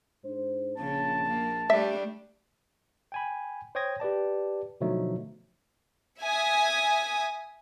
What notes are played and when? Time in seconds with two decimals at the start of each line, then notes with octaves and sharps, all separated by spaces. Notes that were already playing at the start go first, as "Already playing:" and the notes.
0.24 G#2 D4 C5
0.78 A#1 C#3 A5
1.27 A#3
1.70 G3 A3 D4 E5
3.12 G5 G#5 B5
3.75 C5 C#5 G5 D#6 G#6 A#6
4.00 G4 B4 D5 A5
4.81 B2 D3 F3 F#3 A3 D#4
6.21 E5 G#5 D#6